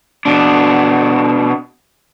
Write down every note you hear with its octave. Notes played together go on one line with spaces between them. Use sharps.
B2 D4